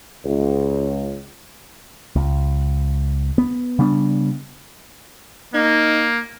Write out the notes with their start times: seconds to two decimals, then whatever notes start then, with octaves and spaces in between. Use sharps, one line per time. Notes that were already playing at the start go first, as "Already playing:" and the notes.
0.24 C#2
2.16 C#2
3.38 B3
3.79 C#3 G3 B3 D4
5.54 A#3 D#4